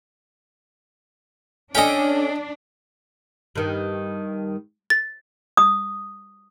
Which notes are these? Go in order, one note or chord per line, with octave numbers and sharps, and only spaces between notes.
C#4 D4 A4 D#5 G5 G#5
G2 D#3
A6
D#6